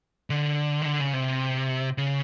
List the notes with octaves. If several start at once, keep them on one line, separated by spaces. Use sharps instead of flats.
D3
D#3
D3
C#3
C3
C#3